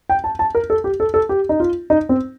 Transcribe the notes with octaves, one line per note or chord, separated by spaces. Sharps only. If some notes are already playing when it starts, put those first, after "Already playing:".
G5
A5
A5
A#4
A4
G4
A4
A4
G4
D#4
F4
D#4
C4